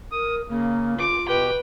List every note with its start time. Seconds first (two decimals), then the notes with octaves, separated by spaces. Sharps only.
0.12 A#4 D#6
0.49 C#3 A#3
0.99 F4 D6
1.27 B2 G4 B4 G5